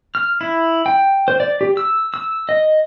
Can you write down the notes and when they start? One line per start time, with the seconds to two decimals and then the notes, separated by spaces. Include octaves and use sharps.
0.15 F6
0.41 E4
0.86 G5
1.28 C5
1.40 D5
1.61 G4
1.77 E6
2.14 E6
2.49 D#5